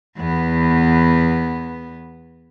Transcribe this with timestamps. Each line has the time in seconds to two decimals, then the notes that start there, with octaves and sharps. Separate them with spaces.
0.17 E2 B3